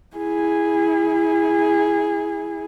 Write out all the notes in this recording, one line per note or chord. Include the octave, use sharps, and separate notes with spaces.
E4 G#4